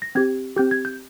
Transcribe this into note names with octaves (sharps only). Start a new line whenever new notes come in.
A#6
C4 G4 G#6
C4 G4 G6
G#6
G6